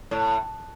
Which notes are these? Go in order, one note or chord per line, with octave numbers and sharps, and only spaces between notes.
A2